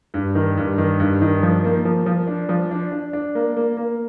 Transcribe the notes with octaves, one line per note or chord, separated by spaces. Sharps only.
G2
D#3
G2
D#3
G2
D#3
F3
A#3
F3
F3
D4
F3
D4
D4
D4
A#3
A#3
A#3